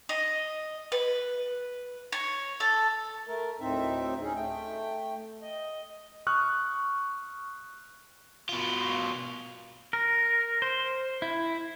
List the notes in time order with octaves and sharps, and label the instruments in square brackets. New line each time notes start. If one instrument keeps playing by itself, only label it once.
[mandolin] D#5
B4
C#5
A4
[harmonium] A3 A#4
D2 A2 C4 D#4 E5
C#4 D#4 G#4
A3 G5
D#5
[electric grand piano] C#6 D#6 F6 F#6
[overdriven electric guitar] B2 F4
[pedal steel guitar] A#4
C5
E4